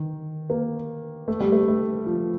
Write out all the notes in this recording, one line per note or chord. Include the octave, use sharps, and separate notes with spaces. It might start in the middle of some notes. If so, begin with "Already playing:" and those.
Already playing: D#3
A#3
A3
G3
A3
A3
F3